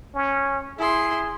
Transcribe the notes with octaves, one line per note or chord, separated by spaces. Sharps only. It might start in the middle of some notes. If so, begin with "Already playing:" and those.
C#4
E4 G#4 C6